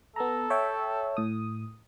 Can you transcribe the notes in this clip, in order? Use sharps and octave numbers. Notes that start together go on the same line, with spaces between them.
B3 A4 A#5
C#5 E5 G5
A2 D#6